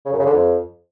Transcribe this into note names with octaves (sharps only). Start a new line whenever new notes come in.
C#3
F#2
C#3
D3
F2